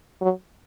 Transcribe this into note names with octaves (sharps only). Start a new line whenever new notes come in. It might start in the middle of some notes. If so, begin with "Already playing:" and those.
F#3